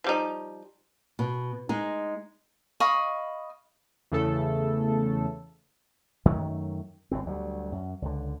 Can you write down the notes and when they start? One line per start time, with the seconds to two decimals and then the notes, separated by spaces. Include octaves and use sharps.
0.04 F3 G3 D#4
1.19 B2
1.69 G#3 D#4
2.80 D#5 F5 B5 C#6
4.12 E2 C#3 A3 A4
6.25 F#2 D#3 F#3 A3
7.11 G1 F#2 C4
7.26 D2 F#3 G3
7.72 F#2
8.02 C#2 D3